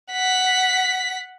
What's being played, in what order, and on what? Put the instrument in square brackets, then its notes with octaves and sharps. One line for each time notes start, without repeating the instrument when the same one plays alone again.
[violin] F#5 B6